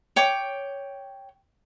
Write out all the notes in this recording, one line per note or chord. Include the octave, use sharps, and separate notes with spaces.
C#5 G5 D6